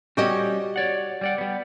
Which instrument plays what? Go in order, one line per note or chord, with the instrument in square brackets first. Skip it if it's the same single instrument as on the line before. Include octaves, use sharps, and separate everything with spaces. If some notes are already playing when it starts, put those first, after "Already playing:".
[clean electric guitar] G3 C#4 [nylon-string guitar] F#4 G4 D#5
[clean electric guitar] C#5 D5 F#5
G3 D5 F#5
G3 B3